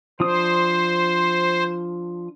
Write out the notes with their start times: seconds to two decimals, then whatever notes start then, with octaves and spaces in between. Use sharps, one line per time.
0.20 F3 D4 C5 D#6